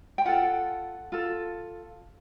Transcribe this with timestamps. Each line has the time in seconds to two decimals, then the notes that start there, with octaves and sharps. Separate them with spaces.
0.18 G5
0.25 F4 A4 F#5
1.12 F4 A4